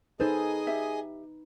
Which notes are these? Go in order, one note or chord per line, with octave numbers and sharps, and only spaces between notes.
D#4 G#4 A4 B4 C5 D#5 G#5
G4 E5